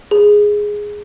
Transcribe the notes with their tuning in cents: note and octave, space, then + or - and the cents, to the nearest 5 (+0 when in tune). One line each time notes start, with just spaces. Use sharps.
G#4 +0